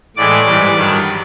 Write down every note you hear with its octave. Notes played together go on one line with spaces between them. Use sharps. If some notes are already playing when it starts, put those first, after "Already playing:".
A2 E3 G#3 D5 D6
G#2 E3 G3
G2 D#3 F#3